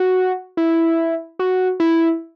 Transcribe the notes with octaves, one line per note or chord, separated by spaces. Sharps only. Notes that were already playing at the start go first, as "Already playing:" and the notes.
Already playing: F#4
E4
F#4
E4